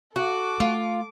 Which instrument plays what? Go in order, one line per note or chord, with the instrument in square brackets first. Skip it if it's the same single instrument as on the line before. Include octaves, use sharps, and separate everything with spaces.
[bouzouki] F#4 [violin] A4 D6
[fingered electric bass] A3 [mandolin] F4